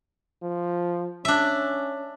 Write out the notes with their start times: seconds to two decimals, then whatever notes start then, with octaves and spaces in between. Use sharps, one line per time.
0.42 F3
1.25 C#4 D4 E5